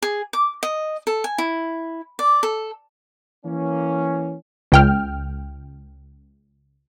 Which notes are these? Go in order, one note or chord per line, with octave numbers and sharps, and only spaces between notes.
G#4
D6
D#5
A4
G#5
E4
D5
A4
E3 A#3 C#4
C#2 G5 F6